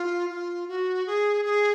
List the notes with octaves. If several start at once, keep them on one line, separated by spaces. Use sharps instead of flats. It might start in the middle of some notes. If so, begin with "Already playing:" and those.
Already playing: F4
F4
F#4
G#4
G#4